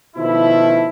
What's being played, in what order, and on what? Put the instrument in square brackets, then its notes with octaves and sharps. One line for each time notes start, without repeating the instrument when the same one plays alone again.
[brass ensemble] B2 D#3 F3 A3 E4